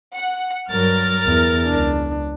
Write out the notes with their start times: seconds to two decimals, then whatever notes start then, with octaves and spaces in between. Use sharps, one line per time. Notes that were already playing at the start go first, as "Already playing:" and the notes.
0.17 F#5
0.70 G2 F#3 A#4 F6 A6
1.26 E2
1.66 C#2 D4